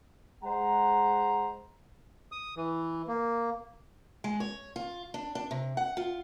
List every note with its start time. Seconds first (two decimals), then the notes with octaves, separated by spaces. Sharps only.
0.44 G#3 C5 F#5 A#5
2.32 D#6
2.57 E3
3.08 A#3
4.24 G#3
4.40 C#5
4.76 F4
5.14 D4
5.35 D4
5.51 C3
5.77 F#5
5.97 F4